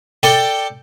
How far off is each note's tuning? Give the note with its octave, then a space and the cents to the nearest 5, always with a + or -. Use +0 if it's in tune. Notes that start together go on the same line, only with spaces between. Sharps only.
A4 +15 D5 +5 G5 +0